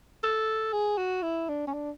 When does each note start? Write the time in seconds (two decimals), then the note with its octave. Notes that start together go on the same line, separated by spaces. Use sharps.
0.24 A4
0.73 G#4
0.98 F#4
1.22 E4
1.49 D4
1.67 C#4
1.74 D4